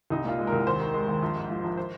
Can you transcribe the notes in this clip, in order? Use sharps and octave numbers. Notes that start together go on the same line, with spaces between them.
C2 D#4
A#2 F4
G#3
A#4
C2
D#2 C5
D#3
G#3
D#2
A#1
G#2
F3
A#1
C5